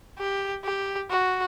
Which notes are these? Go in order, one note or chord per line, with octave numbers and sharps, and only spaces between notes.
G4
G4
F#4